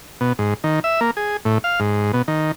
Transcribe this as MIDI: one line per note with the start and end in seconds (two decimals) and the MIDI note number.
0.21 0.33 47
0.39 0.54 44
0.64 0.80 51
0.84 1.00 76
1.01 1.11 58
1.17 1.37 68
1.45 1.58 45
1.64 1.80 77
1.80 2.12 44
2.13 2.22 47
2.28 2.52 51